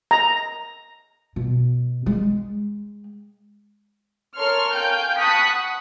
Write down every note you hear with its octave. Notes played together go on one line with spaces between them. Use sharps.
A#5
B2
G#3
A4 A#4 C#5 C6 C#6 F6
F5 G5 G#5 G6
A5 B5 C#6 D#6 F#6 B6
F#5